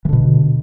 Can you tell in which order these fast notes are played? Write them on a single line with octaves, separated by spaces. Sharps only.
E3 D3 B2